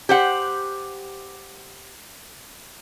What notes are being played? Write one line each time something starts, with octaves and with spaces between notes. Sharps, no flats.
G4 C5 F#5